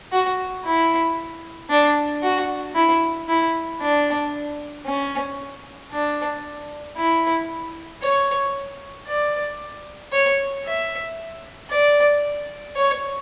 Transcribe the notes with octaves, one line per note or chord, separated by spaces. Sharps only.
F#4
E4
D4
F#4
E4
E4
D4
C#4
D4
E4
C#5
D5
C#5
E5
D5
C#5